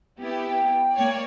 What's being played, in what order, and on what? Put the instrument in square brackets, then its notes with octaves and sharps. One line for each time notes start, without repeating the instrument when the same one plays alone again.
[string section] B3 E4 G4
[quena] G5
[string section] A#3 C#5 D5